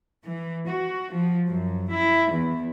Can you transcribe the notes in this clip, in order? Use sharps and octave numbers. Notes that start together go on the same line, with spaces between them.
E3
F#4
F3
F#2
E4
E2